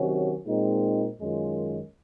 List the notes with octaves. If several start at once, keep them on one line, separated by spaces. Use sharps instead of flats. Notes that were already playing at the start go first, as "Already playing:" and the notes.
Already playing: C3 D#3 F#3 C#4 F#4
A#2 G#3 C4 D#4
F#2 D#3 G#3 C#4 F4